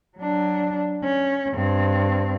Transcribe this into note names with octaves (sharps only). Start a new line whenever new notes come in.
F#3 D4
C#4
G2 C4